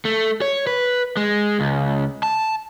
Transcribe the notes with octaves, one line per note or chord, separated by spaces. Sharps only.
A3
C#5
B4
G#3
C#2
A5